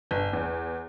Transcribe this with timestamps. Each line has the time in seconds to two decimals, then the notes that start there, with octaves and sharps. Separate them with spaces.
0.11 G1
0.33 E2